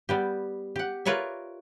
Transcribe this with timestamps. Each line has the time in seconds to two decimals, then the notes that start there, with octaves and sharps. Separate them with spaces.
0.09 G3 B3 G4
0.76 G4 F#5
1.05 F4 A#4 B4 C#5 D5 E5